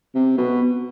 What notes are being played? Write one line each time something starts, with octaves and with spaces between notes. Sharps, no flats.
C3
B2